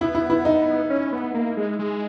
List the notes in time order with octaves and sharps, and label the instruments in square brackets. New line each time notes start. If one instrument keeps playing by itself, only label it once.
[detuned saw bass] B3 [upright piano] E4
[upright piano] E4
E4
D#4
[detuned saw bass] C#4
B3
A#3
G#3
G#3